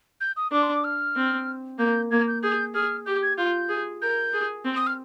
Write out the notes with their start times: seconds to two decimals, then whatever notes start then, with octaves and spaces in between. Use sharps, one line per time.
0.20 G6
0.36 D#6
0.52 D4 D6
0.62 C6
0.73 D6
0.84 F6
1.16 C4
1.79 A#3 G6
2.11 A#3 G#6
2.27 G6
2.43 G#4 G6
2.74 G#4 F6
3.06 G4 G6
3.22 G#6
3.38 F4 G6
3.69 G#4
4.02 A#4 G6
4.33 G#4
4.64 C4
4.76 D#6
4.86 F6